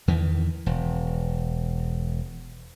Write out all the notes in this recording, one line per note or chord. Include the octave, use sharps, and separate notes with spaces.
E2 D#3 E3
E1